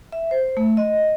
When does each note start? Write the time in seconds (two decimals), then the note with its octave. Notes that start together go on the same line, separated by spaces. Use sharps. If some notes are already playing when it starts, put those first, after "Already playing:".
0.12 E5
0.31 C5
0.57 A3
0.77 D#5